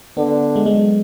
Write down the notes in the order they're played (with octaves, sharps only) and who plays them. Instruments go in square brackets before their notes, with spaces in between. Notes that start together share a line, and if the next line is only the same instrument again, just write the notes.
[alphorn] D3 [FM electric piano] B3
[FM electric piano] G#3
G#3
F#3